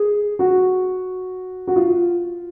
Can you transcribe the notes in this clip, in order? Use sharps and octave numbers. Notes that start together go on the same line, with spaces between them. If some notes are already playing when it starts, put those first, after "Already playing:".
Already playing: G#4
F#4
F#4
F4